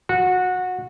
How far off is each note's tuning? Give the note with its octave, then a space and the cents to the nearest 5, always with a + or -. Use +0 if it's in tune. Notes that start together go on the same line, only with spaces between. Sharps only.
F#4 -20